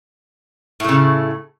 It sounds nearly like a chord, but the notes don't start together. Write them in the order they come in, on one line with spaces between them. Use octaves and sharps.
A2 A3 C#3